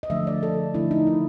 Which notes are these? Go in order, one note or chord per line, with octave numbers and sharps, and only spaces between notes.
D#5
D3 F3 A3 D4 E5
D5
A4
D3 F3 A3 D4 E4
D#4
E4